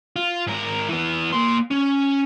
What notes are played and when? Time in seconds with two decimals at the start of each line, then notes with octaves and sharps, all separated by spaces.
0.16 F4
0.47 G#2 A#4
0.89 E3 B3
1.33 A#3 C6
1.71 C#4